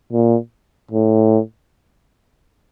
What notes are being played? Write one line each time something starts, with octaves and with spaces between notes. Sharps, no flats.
A#2
A2